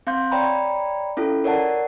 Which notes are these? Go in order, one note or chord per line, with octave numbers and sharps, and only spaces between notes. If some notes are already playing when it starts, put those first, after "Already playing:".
C4 F5 C6 G6
C#5 D5 G5 A#5 B5
C#4 E4 F4 A4
A#4 C#5 D5 F#5 A5